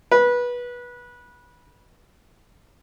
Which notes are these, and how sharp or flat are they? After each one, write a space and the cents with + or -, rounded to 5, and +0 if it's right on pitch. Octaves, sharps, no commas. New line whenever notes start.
B4 -20